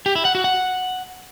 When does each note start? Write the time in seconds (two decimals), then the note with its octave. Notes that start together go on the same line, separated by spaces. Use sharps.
0.06 G4
0.15 E4
0.25 F#5
0.35 F#4
0.44 F#5